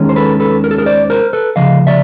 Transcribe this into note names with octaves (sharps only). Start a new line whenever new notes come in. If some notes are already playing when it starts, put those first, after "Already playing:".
Already playing: D#2 D#3 G#3 C#4
C5
A4 B4
A4 B4
A#4
A4
G#4 A#4
C5 D5
A#4 C5
A4 B4
D2 C#3 F3 D#5 F5
D5 E5